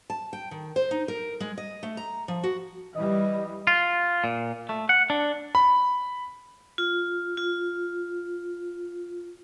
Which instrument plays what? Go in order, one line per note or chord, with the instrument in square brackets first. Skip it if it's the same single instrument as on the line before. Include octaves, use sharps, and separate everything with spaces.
[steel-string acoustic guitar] A5
G5
D#3
C5
D#4
A#4
G#3
D#5
A3
A#5
F3
F#4
[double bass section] E3 G3 [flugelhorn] D#5
[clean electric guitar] F4
A#2
A3
F#5
D4
[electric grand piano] B5
[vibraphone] F4
F4